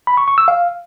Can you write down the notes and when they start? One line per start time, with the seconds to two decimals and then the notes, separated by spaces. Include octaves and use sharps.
0.07 B5
0.17 C#6
0.28 C#6
0.38 E6
0.48 F5